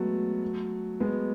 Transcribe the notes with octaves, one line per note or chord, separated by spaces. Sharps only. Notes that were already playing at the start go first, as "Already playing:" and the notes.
Already playing: F#3 G#3 A3 B3
G#3 B3